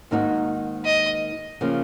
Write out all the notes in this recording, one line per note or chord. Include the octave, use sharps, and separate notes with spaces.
G#2 D#3 A#3 D#4 F#4
D#5
C#3 F3 A#3